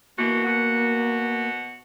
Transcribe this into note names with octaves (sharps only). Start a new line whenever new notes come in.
B2 E3 A#3 F#4
B2 F#4